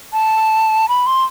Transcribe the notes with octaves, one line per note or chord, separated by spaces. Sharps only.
A5
B5
C6